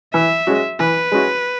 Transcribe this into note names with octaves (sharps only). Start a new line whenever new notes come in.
E3 E5
G#3 C#4 F#4
E3 B4
G#3 C#4 F#4